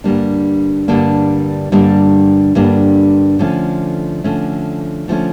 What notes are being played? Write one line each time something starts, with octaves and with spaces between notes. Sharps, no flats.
G2 D3 G3 A#3 D4
G2 D3 G3 A#3 D4
G2 D3 G3 A#3 D4
G2 D3 G3 A#3 D4
D3 F3 A3 C#4
D3 F3 A3 C#4
D3 F3 A3 C#4